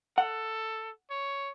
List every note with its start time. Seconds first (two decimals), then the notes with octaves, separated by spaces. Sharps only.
0.18 A4 F#5
1.10 C#5